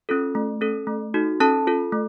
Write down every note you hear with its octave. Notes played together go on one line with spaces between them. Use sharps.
C#4 F4 A4
A3
C#4 A4
A3
D#4 F#4 A4
C#4 A4 A5
F4 A4
A3